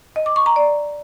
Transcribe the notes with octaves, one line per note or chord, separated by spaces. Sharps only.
D#5
D6
C#6
A#5
D5